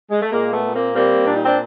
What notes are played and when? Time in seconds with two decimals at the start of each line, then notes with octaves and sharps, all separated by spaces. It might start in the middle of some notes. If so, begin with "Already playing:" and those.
0.10 G#3
0.21 A3
0.31 A#2 G#3 A#3
0.52 A3 B3
0.63 A#2
0.73 A#3 C4
0.93 G3 A#3 C4
1.25 A#2 D4
1.35 D#4
1.45 C4 D4